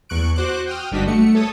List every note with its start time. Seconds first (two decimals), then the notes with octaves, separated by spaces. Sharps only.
0.09 E2 C#6 F#6 D7
0.36 F#4 C5 D6 F#6
0.67 G5 D#6 F6
0.92 G1 G3 D4 F#4 D#5 B6
1.08 A3 C#7
1.35 A4 C#5 D#6